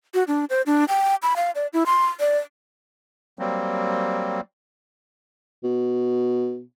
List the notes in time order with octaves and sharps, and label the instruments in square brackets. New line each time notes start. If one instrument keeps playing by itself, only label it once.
[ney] F#4
D4
C5
D4
G5
B5
F5
D5
E4
C6
D5
[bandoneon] F#3 G3 A#3 C4
[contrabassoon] B2